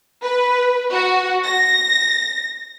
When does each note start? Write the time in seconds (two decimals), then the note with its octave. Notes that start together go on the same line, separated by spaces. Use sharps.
0.23 B4
0.91 F#4
1.44 A#6